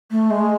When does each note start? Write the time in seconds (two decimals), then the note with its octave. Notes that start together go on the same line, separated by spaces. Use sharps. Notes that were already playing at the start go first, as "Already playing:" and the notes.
0.11 A3
0.30 G#3